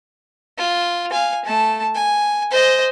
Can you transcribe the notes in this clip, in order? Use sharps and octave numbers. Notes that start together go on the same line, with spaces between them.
F4
F5 G#5
A3 A5
G#5
C5 D#5